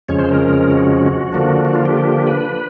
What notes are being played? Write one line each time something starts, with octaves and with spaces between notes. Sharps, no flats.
F2 C#3 F3 G#3 C#4 C#5
C5
A#4
F#4
D3 F3 A#3 D4
F#4
F4
G4
B4